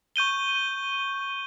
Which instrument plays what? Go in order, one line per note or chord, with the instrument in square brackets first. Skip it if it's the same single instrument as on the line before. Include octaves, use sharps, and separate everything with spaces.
[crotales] C#6 G6 D#7 G7